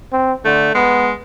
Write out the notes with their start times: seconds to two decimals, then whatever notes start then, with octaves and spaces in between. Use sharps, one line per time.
0.13 C4
0.45 D3 A3
0.75 G#3 B3